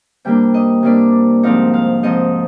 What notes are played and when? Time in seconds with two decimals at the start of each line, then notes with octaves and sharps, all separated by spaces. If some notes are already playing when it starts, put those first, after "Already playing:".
0.25 C3 G3 A#3 D4 G5
0.54 D#5
0.83 C3 G3 A#3 D4 D5
1.43 G#2 F3 C4 D#4 F5
1.74 F5
2.03 G#2 F3 C4 D#4 D#5